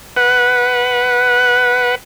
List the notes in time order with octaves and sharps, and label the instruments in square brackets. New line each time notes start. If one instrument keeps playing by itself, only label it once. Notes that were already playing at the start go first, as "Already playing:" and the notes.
[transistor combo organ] B4 F#5